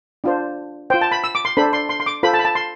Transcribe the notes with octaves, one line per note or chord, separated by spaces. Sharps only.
D4 F4 C5
F4 C5 G5
A5
B5
E6
D6
C6
D4 A4 C5 B5
C6
C6
C6
D6
F4 A4 C5 B5
A5
B5
A5
C6